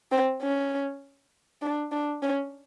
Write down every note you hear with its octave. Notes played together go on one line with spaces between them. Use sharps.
C4
C#4
D4
D4
C#4